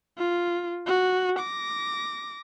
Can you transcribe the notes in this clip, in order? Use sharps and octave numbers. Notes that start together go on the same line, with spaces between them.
F4
F#4
D6 A#6